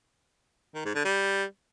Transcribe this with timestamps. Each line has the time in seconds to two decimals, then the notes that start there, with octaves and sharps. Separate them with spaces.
0.75 D#3
0.85 G#2
0.95 D3
1.05 G3